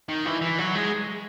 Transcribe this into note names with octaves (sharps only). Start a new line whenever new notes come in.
D#3
E3
E3
F#3
G#3